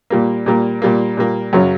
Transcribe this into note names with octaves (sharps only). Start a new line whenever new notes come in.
A#2 G3 A#3
A#2 G3 A#3
A#2 G3 A#3
A#2 G3 A#3
F#2 C#3 F#3